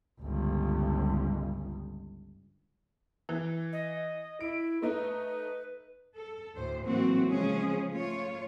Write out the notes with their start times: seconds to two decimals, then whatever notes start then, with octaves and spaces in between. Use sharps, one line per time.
0.21 G1 C#2
3.29 E3
3.73 D#5
4.41 E4 D7
4.82 A3 D#4 B4
6.16 A4
6.55 D2 A2 C5
6.85 A2 E3 F#3 A#3 C4 F#4
7.29 C#3 F3 G#3 C#4 G#4
7.90 A3 F4 C#5